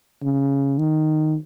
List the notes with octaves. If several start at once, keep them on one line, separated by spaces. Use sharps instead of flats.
C#3
D#3